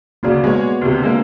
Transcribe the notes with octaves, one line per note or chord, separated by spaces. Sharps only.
D2 C#3 A#3 F#4 D5
G#3 B3 C#5
D2 C3
D3 G#3 A#3